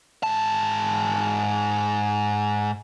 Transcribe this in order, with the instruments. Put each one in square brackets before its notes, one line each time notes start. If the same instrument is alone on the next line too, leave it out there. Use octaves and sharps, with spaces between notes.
[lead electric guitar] G#2 A5